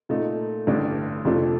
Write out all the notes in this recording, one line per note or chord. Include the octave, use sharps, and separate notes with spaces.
A#2 A3 D#4
A1 G2 D3 G3 D4
F2 C3 F3 A3 D4